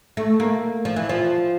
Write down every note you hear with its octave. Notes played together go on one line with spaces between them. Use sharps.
A3
A#3
F3
E3
F3